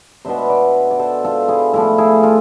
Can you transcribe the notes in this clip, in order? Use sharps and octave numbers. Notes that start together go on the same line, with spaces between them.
B2 B3 D4 C5 E5
B4 D5
D5
A4 C5
F4 A4
E4 G#4
A2 F3 A3 E4
E4 G#4
F4 A4